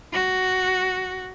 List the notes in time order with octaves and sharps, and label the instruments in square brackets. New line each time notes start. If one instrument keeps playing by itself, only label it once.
[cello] F#4